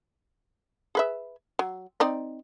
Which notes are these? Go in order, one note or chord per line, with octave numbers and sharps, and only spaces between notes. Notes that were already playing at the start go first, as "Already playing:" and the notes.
G#4 B4 E5
F#3
C4 D#4 D5